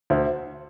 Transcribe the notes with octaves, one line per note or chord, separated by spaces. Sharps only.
D2 C5 E5